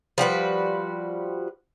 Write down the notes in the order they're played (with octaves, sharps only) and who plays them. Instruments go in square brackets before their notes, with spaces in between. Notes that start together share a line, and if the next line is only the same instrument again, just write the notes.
[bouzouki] F3 G3 F#4 B4